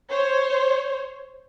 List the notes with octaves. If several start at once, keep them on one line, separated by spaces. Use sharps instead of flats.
C5 C#5